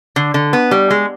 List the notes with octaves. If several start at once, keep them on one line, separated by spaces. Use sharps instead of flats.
D3
D3
B3
G3
G#3